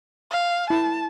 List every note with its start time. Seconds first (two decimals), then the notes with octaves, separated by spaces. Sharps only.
0.31 F5
0.70 E4 A5